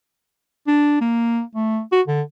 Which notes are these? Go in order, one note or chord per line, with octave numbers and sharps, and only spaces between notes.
D4
A#3
A3
F#4
D3